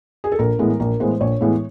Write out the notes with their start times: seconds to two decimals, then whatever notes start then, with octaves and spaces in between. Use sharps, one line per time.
0.24 G#4
0.32 A4
0.39 A#1 A#4
0.59 A2 E3 G#3 B3
0.80 A#1 A#4
1.00 A2 E3 G#3 B3 C5
1.20 A#1 C#5
1.41 A2 E3 G#3 B3